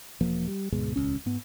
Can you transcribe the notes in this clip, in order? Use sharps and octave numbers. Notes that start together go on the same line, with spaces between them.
E1 F3 A#3
G3
D2 G#2 B2 G#3
D#1 C#2 C#4
G#2 B3